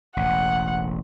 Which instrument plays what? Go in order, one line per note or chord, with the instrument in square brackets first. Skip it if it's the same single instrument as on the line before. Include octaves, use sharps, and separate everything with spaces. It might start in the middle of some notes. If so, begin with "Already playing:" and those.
[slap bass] E1 A1 [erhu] F#5